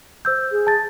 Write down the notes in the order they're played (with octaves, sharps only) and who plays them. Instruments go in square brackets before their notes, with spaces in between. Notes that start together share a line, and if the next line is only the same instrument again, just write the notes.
[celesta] C5 E6 G6
[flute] G#4
[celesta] A5 A6